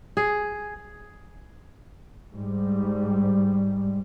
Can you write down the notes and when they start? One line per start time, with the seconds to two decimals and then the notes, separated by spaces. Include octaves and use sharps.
0.17 G#4
2.32 G#2 G3